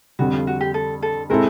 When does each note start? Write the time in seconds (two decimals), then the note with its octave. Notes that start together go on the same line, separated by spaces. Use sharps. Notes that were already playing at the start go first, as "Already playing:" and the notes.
0.19 F2 D3 G3 F#4
0.33 F4
0.47 F#4
0.61 G4
0.74 A4
1.02 A4
1.30 G#3 C4 E4 A4 A#4